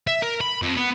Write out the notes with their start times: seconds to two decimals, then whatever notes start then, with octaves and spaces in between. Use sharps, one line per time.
0.07 E5
0.22 A#4
0.41 B5
0.62 F2
0.76 B3